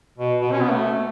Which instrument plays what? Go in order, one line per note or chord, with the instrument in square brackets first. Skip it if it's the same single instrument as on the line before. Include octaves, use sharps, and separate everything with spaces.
[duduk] B2
B2
C#4
B3
A3